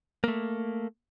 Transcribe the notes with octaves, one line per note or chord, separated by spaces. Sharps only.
A3 A#3